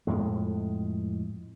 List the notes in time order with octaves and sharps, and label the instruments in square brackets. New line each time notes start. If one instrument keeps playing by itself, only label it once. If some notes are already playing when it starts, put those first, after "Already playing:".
[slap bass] F2 A2 G#3